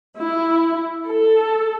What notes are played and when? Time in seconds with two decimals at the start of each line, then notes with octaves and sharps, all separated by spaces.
0.18 E4
1.09 A4